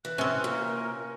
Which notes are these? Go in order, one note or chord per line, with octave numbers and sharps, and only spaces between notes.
E3 F#6
C3 C4 C#4
A#2 A#4